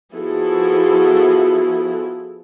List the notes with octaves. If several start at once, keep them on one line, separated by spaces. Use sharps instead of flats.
F3 B3 E4 F#4 G#4 A4